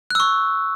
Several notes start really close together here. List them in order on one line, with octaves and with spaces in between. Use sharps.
F#6 E6 C#6